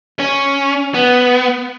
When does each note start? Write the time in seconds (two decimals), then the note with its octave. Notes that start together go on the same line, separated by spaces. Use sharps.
0.20 C#4
0.94 B3